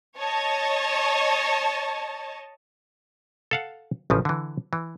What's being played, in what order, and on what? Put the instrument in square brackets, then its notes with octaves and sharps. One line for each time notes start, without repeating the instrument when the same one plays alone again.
[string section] C#5 D#5 A5
[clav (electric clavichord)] A4 F5 F#5
A1 C#3 F3
D3 E3
E3